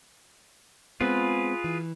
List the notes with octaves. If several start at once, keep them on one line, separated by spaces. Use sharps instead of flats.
G#3 B3 C4 F4 G#4 B4
E3